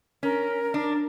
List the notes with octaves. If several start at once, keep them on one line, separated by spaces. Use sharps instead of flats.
C#4 A#4
D4